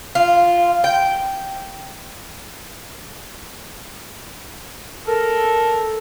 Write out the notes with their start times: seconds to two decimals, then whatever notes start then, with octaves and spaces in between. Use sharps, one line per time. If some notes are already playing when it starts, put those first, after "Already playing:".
0.15 F4
0.84 G5
5.07 A4 A#4